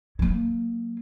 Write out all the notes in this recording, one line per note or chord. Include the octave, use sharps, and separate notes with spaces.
F#3 A#3